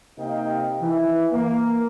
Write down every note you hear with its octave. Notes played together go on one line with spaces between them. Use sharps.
C3 A#3 D#4 D#5 F5 G5
E3
A#3